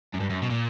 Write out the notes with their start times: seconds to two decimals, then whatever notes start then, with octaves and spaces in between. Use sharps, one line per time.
0.14 F#2
0.20 G2
0.30 F#2
0.42 B2
0.50 A#2